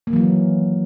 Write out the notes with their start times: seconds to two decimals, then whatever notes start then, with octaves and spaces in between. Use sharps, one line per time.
0.07 A#3
0.10 D#3
0.13 F#3
0.16 E3